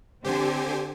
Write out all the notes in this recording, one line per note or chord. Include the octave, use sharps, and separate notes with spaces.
D3 C4 G4 C5 G#5